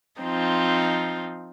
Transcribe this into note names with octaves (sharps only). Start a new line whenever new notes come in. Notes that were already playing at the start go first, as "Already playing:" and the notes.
F3 C4 D#4 F4